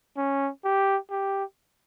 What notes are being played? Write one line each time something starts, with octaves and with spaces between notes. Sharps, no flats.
C#4
G4
G4